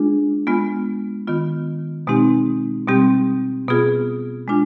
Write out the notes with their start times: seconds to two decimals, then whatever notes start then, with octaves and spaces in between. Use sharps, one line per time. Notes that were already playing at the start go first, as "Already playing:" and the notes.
Already playing: G#3 D4 F4 G#4
0.47 G#3 B3 F4
1.27 D#3 B3 F4
2.07 B2 G#3 C4 D#4 G4
2.88 B2 G3 C4 G4
3.68 B2 B3 F4 G#4
4.48 G#3 D4 F4